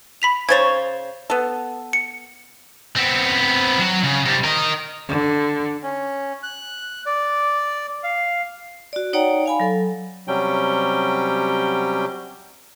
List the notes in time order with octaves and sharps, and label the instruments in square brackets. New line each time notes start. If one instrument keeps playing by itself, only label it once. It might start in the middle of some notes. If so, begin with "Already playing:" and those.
[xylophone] B5 B6 F7
[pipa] C#3 C5 C#5 [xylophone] G#6 A6
[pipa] B3 A4
[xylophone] C#7
[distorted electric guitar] B3 C4
F#3 F#4
C#3
C3 G3
A#4 D#5
[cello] D3
[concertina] C#4
F#6
D5
F5
[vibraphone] F#4 D5
D#4 C#5 D5 F#5 G5 A#5
F5 G#5 B5
F#3 A4
[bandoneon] C3 F#3 G3 C#4 G5